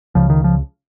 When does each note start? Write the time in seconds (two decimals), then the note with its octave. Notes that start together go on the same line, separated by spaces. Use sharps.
0.15 C#2 C#3 F3
0.30 D#3
0.44 F3